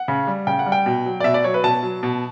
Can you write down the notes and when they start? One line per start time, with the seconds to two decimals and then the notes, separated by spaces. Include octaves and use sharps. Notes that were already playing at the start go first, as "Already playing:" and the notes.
Already playing: F#5
0.08 C#3
0.27 G3
0.47 C#3 G5
0.59 F#5
0.66 G3
0.72 G5
0.86 B2
1.06 F#3
1.20 D5
1.24 B2 E5
1.34 D5
1.44 F#3 C#5
1.54 B4
1.64 B2 A5
1.83 F#3
2.03 B2